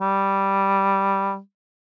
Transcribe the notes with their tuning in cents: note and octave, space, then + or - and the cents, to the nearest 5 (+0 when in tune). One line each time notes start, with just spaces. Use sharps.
G3 -5